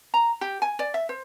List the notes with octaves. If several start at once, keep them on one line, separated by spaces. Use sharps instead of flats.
A#5
G4
G#5
D5
E5
C5